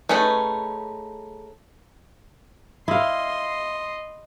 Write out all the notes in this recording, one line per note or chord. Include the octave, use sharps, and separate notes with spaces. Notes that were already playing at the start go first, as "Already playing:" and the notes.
A3 C#4 D#4 G#4 B4
E4 D#5 F5 C6